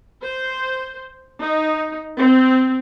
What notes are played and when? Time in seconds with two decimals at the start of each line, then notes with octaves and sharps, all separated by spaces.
0.22 C5
1.42 D#4
2.20 C4